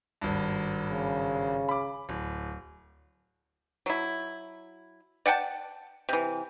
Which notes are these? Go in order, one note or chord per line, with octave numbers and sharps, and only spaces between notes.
G#1 G2
C#3
B5 D6
D1
F#3 E4
D5 F#5 G5 A5
C3 E3